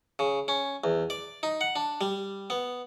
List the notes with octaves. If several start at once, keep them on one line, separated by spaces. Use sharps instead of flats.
C#3
C#4
E2
D5
D#4
F#5
D4
G3
B3